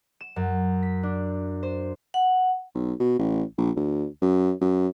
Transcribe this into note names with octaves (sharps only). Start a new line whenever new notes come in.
E7
F#2
B6
D4
C5
F#5
B1
B2
A1
A#1
D2
F#2
F#2